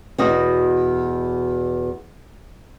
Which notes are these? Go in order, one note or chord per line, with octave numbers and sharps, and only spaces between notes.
E2 B2 F#4 D#5